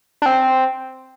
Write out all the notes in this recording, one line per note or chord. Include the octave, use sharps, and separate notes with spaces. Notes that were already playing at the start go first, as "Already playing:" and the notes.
D4
C4